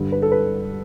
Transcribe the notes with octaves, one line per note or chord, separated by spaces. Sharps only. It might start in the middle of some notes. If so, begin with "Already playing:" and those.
Already playing: G2 D3
B4
A4
B4